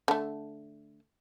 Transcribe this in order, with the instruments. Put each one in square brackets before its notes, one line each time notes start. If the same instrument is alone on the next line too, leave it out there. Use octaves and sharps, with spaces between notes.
[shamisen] D3 A3